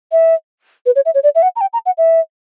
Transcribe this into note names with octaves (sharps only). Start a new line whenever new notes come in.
E5
B4
C#5
E5
C#5
D5
E5
F#5
A#5
G5
A#5
F#5
E5